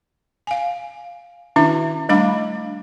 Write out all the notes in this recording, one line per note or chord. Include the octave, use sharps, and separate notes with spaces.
F5 G#5
D#3 C#4 D4 E4 F#4 E5
G3 A3 D4 F5 B5 D6